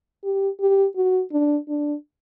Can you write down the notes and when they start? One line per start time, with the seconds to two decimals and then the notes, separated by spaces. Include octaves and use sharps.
0.24 G4
0.60 G4
0.96 F#4
1.32 D4
1.69 D4